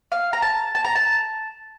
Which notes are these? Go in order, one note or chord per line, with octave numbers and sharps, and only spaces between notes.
F5
A#5
A5
A5
A#5
A5